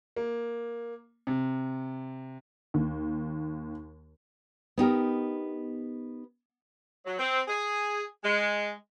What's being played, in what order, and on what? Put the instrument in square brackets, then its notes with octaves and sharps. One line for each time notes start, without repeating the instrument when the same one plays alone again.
[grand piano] A#3
C3
[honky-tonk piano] D#2
[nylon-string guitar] B3 D#4 G4 A#4
[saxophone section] F#3
C4
G#4
G#3